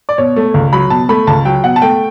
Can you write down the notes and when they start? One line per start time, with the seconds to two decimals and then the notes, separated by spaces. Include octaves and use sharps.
0.09 D5
0.18 B2 C#5
0.36 A3
0.54 C#2
0.73 F#3 B5
0.90 B2 A5
1.09 A3 B5
1.27 C#2 A5
1.45 F#3 G5
1.64 B2 F#5
1.76 A5
1.82 A3 G5